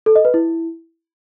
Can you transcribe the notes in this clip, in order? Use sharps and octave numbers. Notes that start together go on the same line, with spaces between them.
A4
D#5
B4
E4